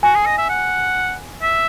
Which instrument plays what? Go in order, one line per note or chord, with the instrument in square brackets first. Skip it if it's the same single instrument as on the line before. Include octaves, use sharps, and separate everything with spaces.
[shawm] F#4 [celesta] G#5
[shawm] G#4
D#5
E5
F#5
E5